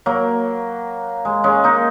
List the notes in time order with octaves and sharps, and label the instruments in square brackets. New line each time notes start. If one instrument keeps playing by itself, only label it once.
[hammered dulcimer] F#3 A#3
G#3
G#3 C#4
A#3 D#4